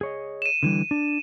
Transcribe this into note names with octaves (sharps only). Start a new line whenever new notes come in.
G#4 C#5 D#5
D#7 E7
D3 E3 G3
D4